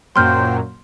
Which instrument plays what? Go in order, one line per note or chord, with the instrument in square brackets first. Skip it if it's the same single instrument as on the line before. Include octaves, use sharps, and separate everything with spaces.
[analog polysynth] F#2 A#2 F#3 [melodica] C5 G5 [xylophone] C6 F6 G6